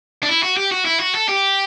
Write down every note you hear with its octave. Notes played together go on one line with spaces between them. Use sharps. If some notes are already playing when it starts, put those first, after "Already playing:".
D4
E4
F#4
G4
F#4
E4
F#4
A4
G4